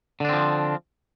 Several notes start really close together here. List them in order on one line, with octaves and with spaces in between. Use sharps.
D3 D4 C4 F3